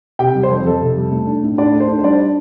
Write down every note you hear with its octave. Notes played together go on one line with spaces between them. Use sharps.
C3 G4 G5
G3
C5
F2
F2 A4
C3
G3
A3
D4
A2
A2 D4 D5
A3
C5
D4
C5
G3 D4 D5
D4